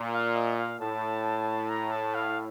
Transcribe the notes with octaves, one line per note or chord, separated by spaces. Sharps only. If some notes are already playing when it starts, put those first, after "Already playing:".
Already playing: A#2
F5
D#5
F5
A2 A5
A#5
A5
F5